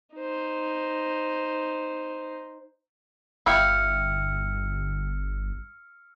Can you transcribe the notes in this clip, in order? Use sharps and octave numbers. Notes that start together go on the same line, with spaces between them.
D#4 C5
G1 E4 G4 F5 E6 F6 C#7